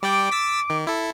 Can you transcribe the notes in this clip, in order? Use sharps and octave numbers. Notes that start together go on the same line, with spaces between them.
G3 D5 G5 D6
E6 A6 B6
D#3
E4 A4